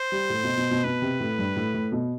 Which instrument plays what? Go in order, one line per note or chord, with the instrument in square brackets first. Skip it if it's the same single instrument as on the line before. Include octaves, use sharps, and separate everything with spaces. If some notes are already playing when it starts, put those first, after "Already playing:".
Already playing: [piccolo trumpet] C5
[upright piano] G3
A2
B2
B2
B2
[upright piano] B2 [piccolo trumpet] B4
[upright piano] C3
A2
G2
A2
A2
B2